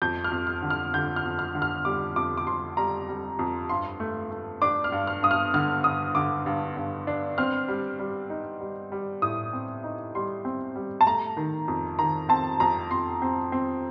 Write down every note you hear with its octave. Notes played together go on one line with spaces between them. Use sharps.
F2 G6
F6
F2
F6
D3
F6
D3 G6
F6
F2
F6
D3
F6
G3 D6
F2 D6
D6
F2 C6
G3 A#5
G3
F2
G2 C6
A3
A3
D4 D6
F6
G2
F6
G2 D#6
F6
D3 F6
G2 D#6
D3 D6
G2
G2
D4
C4 F6
G3
G3
D#4
G3
G3
A2 D#6
C4
D#4
G3 C6
C4
G3
A5
A3 A#5
D#3
F2
D#3 A#5
C4 A5
F2 A#5
F2 C6
C4
C4